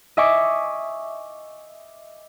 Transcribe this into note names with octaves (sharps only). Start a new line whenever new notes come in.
D#5 E5 G#5 C#6 D6